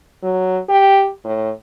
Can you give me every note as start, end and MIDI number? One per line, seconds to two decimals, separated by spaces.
0.23 0.58 54
0.69 1.09 67
1.25 1.50 45